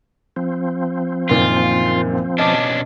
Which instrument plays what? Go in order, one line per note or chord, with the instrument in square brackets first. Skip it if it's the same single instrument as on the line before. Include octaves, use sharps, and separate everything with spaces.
[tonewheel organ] F3 C4
[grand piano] F#1 A#2 D#3 [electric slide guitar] F4
[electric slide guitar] B2 C#4 D4 [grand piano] D#5 A5 D6